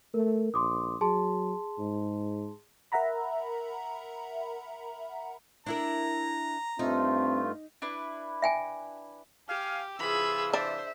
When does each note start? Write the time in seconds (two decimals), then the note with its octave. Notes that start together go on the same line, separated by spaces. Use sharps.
0.14 A3 A#4
0.54 A#1 C6 D6 D#6
1.01 F#3 G#4 A5 C6
1.79 G#2
2.92 A#4 E5 F#5 A#5 B5
5.67 D4 E4 A#4 A#5
6.79 G2 A3 C4 D#4 F4
7.82 D4 E4 B4
8.42 E5 G5 G#5
9.48 G4 F5 G#5
9.99 C3 E3 F4 G#4 B5 E6
10.54 D4 C5 E5